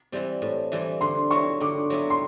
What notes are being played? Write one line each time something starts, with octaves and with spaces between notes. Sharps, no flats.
E3 G3 C4
A2
E3 G3 C4
D3 C6
F#3 B3 E4 C#6
D3 D6
F#3 B3 E4
C6